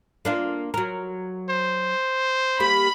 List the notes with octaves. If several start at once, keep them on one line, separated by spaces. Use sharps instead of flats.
A#3 D4 F4
F#3 A#4
C5
A#3 G4 B5